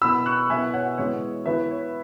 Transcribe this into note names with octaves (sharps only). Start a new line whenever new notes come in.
B2 B3 E4 B5 E6
C#6 F#6
B2 B3 E4 E5 G#5
C#5 F#5
E3 G#3 B3 C#5
E3 B3 E4 B4 E5
C#5